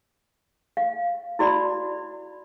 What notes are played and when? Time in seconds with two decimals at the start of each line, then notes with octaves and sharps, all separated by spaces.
0.77 F5
1.39 E4 F#4 D5 B5